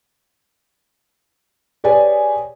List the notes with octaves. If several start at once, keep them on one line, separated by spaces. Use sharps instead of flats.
G4 G#4 B4 C#5 D5 G#5